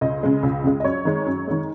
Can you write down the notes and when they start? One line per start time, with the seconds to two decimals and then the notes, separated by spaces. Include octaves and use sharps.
0.01 C#2 D#5
0.23 C#3 G#3
0.43 C#2
0.64 C#3 G#3
0.80 D#5
0.84 F#2 C#5
1.05 D#3 G#3
1.26 F#2
1.48 D#3 G#3